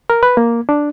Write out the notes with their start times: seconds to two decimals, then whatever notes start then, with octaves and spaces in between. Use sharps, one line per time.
0.10 A#4
0.23 B4
0.37 A#3
0.69 D4